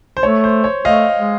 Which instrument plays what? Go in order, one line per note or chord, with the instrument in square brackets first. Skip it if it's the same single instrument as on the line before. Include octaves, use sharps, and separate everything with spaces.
[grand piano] C5
[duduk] A3 [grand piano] C#5
[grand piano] C5
C#5
[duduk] A3 [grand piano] D#5 F5
[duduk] G#3